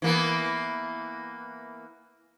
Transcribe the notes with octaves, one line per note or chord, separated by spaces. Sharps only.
E3 A#3 B3